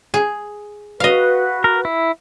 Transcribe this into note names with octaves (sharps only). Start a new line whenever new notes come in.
G#4
F#4 B4 D#5 F5
A#4
E4